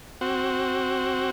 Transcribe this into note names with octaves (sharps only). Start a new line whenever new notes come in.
C4 F#4